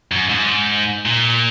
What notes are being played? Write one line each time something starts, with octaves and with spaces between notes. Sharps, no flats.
F#2
G#2
A#2